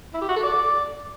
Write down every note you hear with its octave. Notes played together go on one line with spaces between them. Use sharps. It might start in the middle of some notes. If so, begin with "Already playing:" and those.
E4
G4
F#4
A4
D5